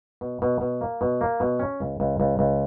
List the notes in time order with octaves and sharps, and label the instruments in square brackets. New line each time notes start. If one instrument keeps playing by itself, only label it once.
[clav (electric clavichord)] B2
B2
B2
A#3
B2
A#3
B2
C#4
C#2
C#2
C#2
C#2